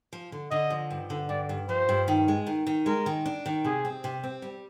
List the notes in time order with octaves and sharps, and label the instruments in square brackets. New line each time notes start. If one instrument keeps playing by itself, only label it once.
[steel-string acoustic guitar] F3
D3
[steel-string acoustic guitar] D3 [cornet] D#5
[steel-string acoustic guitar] F3
G2
D3
[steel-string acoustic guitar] G2 [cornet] D5
[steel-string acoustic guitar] G2
[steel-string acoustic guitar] F3 [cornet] C5
[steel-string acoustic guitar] G2
D#3
G#3
D#3
D#3
[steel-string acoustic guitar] G#3 [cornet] A#4
[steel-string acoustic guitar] D#3
D4
D#3
[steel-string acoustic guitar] C3 [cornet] G#4
[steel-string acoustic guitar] C4
C3
C4
G3